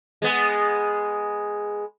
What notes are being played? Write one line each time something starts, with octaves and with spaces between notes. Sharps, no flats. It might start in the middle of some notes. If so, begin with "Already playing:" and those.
G#3 B3